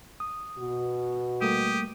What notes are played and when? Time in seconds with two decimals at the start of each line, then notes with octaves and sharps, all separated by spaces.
0.20 D#6
0.59 B2 F#4
1.42 G3 A3 A#3 G4 D#6